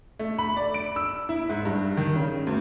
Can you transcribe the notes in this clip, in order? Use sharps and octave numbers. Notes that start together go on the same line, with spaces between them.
A3
B5
D5
D7
E6
E4
G#2
G2
D#3
C#3
D2